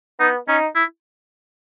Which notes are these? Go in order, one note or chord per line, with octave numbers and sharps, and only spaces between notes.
B3 D#4
C#4 D#4
E4